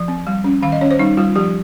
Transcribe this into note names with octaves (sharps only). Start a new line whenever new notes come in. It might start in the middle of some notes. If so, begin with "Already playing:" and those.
Already playing: F3
C4
G3
C#4
D#3 F5
D#5
C#4 C#5
C5
G3 D#4
G3 F4
F3 G4